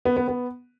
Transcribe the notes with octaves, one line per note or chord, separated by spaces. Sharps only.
B3
B3
B3